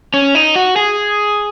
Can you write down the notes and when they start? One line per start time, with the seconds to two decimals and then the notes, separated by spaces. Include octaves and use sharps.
0.14 C#4
0.35 D#4
0.56 F#4
0.76 G#4